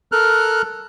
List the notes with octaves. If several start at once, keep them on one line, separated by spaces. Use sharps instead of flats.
A4 A#4 F6 F#6